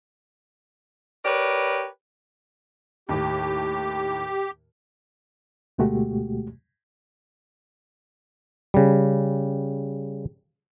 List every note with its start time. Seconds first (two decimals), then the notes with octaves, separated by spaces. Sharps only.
1.25 G4 A#4 B4 C#5 D5
3.09 D#2 A2 G4
5.78 D2 B2 G#3 A3 F#4 G4
8.74 C#3 G3